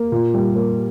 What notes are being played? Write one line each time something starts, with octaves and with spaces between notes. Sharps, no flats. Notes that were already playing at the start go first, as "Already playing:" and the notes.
Already playing: A#3
A#2
G3
A#3